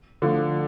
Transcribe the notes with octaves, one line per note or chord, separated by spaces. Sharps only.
D3 F3 A3